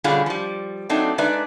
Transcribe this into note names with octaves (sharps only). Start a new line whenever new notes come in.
B2 D3 G3 C#4 F4 G#4
F3 G3
F#3 A3 C4 D4 D#4
G#3 D4 D#4 B4 D5 E5